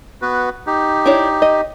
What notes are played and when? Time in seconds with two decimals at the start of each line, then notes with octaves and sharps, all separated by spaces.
0.22 B3 F#4 B4
0.67 D#4 G4
1.06 D4 E4 C#5
1.42 D#5